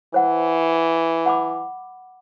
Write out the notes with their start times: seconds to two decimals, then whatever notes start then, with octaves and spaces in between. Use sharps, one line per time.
0.14 E3 C5 F#5
1.26 F#5 B5 D6